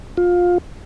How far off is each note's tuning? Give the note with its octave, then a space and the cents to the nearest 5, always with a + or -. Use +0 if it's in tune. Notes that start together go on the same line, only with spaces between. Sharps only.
F4 +20